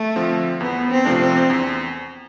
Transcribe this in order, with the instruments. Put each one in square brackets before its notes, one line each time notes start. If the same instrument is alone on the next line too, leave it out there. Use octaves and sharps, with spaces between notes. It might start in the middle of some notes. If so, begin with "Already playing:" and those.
Already playing: [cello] A3
[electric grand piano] D3 F3 C4
[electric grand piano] E2 [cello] B3
[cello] C4
[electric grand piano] C3 F3 A3 D4
[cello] C4
[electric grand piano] E2